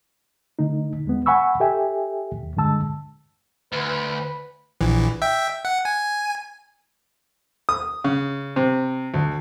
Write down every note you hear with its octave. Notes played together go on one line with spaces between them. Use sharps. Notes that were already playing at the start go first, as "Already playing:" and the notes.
D3 A3 D#4
D#2 G#3 B3
F#5 G#5 B5 C#6 E6
G4 A4 E5 G5 G#5
D#2
G2 D3 G#3 A5 E6
D2 B4
A#1 E3
E5 G5
F#5
G#5
D#6
C#3
C3
D2